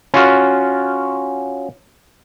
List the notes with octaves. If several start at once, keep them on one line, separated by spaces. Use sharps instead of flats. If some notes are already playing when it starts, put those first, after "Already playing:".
C#4 F4 F#4